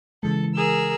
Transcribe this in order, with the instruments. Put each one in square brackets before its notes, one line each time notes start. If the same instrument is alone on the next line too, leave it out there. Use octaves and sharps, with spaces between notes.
[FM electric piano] C#3 E3 G#3 [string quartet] A4
[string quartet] G#4 A#4 E6